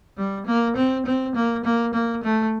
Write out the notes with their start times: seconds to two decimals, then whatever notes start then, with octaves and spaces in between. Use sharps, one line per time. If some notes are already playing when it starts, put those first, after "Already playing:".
0.17 G3
0.46 A#3
0.76 C4
1.06 C4
1.35 A#3
1.64 A#3
1.94 A#3
2.23 A3